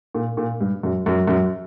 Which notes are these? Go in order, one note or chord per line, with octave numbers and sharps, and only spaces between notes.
A#2
A#2
G2
F#2
F#2
F#2